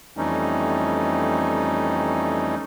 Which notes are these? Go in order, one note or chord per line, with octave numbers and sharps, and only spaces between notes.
F2 E3 G3 A3 C#4 D#4